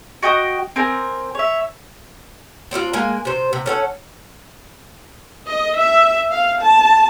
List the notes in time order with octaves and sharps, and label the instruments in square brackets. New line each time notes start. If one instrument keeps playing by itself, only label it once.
[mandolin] F#4 D#5 G5 D#6
C4 A#4 G#5
C#5 E5
[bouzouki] C4 D4 E4 F4
G#3 A#3 G#5
C3 C5
C3
C#4 A4 F#5
[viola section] D#5
E5
F5
A5